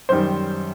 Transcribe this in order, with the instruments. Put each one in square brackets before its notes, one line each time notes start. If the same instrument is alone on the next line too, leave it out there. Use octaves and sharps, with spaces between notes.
[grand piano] F#2 D#3 G3 C5